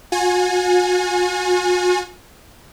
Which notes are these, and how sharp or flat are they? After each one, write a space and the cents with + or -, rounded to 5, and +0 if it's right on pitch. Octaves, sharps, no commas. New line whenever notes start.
F#4 -45 G#5 +0